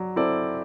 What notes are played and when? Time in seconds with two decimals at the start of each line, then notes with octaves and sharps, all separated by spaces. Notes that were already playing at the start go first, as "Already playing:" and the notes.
Already playing: F#3 D5
0.16 C4 E4 A4 D5